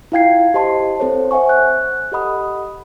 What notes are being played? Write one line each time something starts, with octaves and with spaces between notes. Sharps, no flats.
E4 F4 F5 G5 G#6 C7
G4 C5 D#5 A5 C6
C4 A4 C5 C#5
C5 E5 F#5 G#5 C#6
F#6
G4 A4 D#5 F#5 B5 D#6